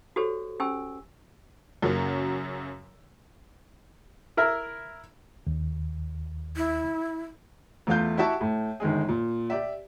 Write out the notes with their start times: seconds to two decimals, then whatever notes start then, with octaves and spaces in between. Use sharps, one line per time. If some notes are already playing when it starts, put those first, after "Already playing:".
0.16 F#4 G4 A4 C5 C#5
0.60 C#4 G4 C5 G#5 E6
1.82 F#2 C#3 F#3 A#3
4.37 E4 A#4 E5
5.47 D#2
6.57 E4
7.87 E2 A3 F4 F5 G6
8.17 E4 F#4 G4 E5 A5 C#6
8.41 A2
8.80 G1 D#3 G#3 G#4
9.08 A#2
9.50 G4 D5 E5